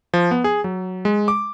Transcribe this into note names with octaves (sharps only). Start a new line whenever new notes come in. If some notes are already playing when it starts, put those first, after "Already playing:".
F3
B3
G#4
F#3
G#3
D6